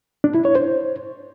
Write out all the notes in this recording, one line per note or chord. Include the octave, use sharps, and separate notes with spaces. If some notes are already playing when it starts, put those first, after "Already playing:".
D4
E4
C#5
C5